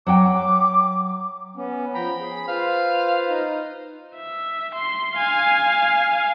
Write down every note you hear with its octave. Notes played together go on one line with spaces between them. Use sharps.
F#3 F#5 G5 D6
B3 C#4
F3 G5 A#5 B5
G#4
F4 B4 C5 F5
D#4
E5
C6
F5 G#5